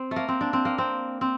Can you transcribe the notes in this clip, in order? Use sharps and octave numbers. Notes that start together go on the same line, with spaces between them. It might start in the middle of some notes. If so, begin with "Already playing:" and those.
Already playing: C4
A3
A#3
C4
D4
C4
A#3
C4
C4